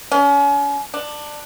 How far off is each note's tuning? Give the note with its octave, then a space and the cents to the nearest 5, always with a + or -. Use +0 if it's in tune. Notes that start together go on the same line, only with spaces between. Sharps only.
C#4 +35
D4 +15